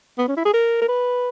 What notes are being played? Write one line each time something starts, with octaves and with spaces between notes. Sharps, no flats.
B3
C#4
E4
G#4
A#4
A#4
B4